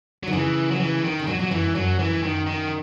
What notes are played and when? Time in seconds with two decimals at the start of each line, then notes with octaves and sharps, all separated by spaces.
0.23 F#3
0.27 D#3
0.33 C#3 E3
0.71 F#3
0.80 E3
1.04 D#3
1.19 C#3
1.27 B2 F#3
1.39 A#2 F#3
1.51 F#2 E3
1.63 G#2
1.75 F#2 F#3
1.99 E3
2.23 F#2 D#3
2.47 D#3